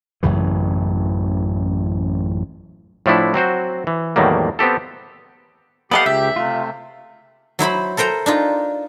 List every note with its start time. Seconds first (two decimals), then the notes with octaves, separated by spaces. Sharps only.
0.23 A1 F#2 C#3 E3
3.06 A2 F3 A3 D4 E4
3.34 F#3 C4 F#4 C5
3.87 E3
4.16 E2 A2 D#3 F#3 G3 A#3
4.59 B3 C4 G4 A4
5.91 B3 G4 A4 D5 D#5 F5 F#5
6.06 C#2 E5
6.36 C3 A3 F4
7.59 F#3 E4 C5 B5
7.97 A4 A#4 C5 G5 A#5
8.26 D4 D#4 F4